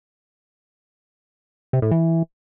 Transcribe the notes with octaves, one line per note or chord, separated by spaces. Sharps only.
C3
A2
E3